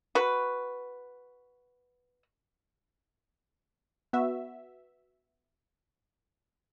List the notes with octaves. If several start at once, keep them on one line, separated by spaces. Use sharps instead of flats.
F#4 B4
B3 F#4 E5